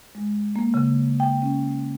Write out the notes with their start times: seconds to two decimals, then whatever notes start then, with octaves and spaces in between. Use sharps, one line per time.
0.15 G#3
0.56 A#3
0.74 C#3
1.20 G5
1.42 C#4